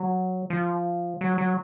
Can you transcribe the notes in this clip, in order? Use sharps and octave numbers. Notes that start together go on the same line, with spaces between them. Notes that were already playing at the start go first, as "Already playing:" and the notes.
Already playing: F#3
F3
F#3
F#3